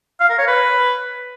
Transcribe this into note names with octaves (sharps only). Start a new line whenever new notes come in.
F5
A#4
C#5
B4